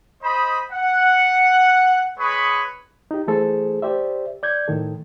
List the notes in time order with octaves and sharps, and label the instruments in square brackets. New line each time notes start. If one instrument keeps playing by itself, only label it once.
[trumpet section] C5 D#5 B5
F#5
G#3 B4 C#5 B5 C#6 D#6
[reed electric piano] D#4 G4
E3 A3 G#4 A4 C5
G4 C5 D5 E5
D5 G6 G#6
A2 D#3 A4